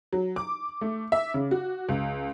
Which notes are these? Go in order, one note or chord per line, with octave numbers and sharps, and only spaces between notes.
F#3
D6
A3
E5
C#3
F#4
C#2